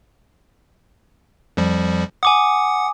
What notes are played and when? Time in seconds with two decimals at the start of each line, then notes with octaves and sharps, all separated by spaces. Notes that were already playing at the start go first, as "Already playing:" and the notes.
1.57 F2 F3 G3
2.23 F#5 G#5 D6 D#6